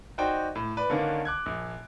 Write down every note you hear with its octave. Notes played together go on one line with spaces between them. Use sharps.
D#4 F#4 C5 D5 G5
A2
B4 D5
D3 D#3 A#3 C#4 D4
D6 F#6 G#6
A#1